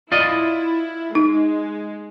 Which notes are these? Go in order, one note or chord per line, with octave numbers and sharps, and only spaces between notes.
E4 F4 D5 D#5
G#3 D#4